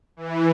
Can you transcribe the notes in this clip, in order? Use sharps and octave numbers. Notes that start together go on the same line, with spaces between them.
E3